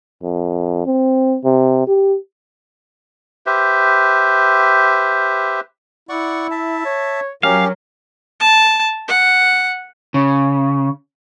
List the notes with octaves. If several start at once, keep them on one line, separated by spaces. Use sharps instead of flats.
F2
C4
C3
G4
G4 B4 C5 E5
E4 D5 F#5 C#6
E5 A5
C#5
F#3 C#4 G4 A#4 F5
A5
F#5
C#3